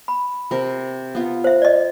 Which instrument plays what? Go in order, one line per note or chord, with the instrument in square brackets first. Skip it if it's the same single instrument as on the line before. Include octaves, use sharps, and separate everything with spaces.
[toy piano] B5
[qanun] C3 A#4
B3 F4
[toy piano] C5 E5
D5 D#5